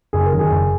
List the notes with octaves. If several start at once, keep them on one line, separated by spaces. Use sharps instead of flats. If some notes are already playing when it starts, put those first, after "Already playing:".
F#1 G#4
A#4
F#2 D#3
G#4
F#1